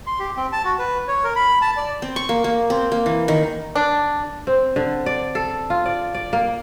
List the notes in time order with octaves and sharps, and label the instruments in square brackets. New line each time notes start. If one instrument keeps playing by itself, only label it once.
[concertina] C6
G4
C4
A5
F#4
B4
C#5
A#4
B5
A5
D5
[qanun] C4
C#6
A#3
A#3
C4
A#3
E3
D#3
[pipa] D4
[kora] C4
D3
D5
A4
F4
D5
D5
A#3